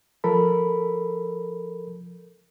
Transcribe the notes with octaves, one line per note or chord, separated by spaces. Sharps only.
F3 A4 A#4 B5